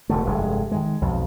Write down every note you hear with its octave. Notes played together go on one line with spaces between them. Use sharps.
E1 D3 A3
F1 G2 C3 G#3
D#3 G#3
B1 F2